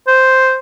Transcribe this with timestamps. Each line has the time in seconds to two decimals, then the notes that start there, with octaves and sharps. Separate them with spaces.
0.07 C5